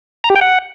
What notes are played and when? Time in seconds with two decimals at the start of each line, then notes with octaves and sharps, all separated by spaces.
0.24 A#5
0.30 G4
0.36 G5
0.41 F#5